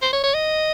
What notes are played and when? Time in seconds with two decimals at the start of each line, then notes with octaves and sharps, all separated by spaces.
0.02 C5
0.13 C#5
0.24 C#5
0.34 D#5